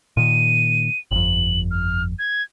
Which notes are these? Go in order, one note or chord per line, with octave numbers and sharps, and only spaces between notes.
A#2 D#3 D#7
G1 F2 F#7
F6
G#6